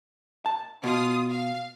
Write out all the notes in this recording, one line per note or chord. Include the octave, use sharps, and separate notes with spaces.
A5
B2 F4 D#6
F5